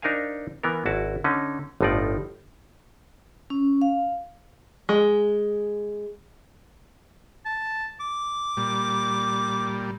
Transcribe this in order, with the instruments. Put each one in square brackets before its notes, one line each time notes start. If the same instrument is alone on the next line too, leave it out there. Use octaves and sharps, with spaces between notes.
[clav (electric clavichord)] D4 D#4 A#4 C5 F5 G#5
E3 B3 A#4
G#1 E4 F#4 A5
D3 C#4 D#4
G1 A2 F3 D#4 F4 D5
[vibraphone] C#4
F5
[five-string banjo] G#3
[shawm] A5
D6
[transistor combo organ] A#2 G3